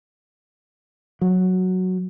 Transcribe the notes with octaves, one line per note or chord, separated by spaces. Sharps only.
F#3